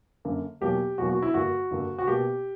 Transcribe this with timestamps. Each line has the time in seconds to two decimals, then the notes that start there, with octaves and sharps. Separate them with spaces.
0.25 F#2 D3 A#3
0.61 E2 B2 F#3 A#3 G4
0.98 E2 B2 F#3 A#3 F#4
1.10 F#4
1.22 E4
1.34 G2 D3 A#3 F#4
1.71 G2 D3 A#3
1.98 F#4
2.07 B2 A#3 G4